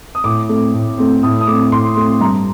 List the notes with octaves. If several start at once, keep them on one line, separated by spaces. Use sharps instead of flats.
D#6
A2 D6
A3 C4
A2
A3 C4
A2 D#6
D#6
A3 C4 D6
A2 C6
A3 C4
G2 A#5